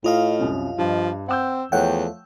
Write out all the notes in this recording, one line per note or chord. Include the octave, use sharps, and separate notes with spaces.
A2 F4 D#5 F5
C2 F#2 C3
G2 F3
C4 F#5 E6 G6
E2 F3 A3 C#5 F#5 G5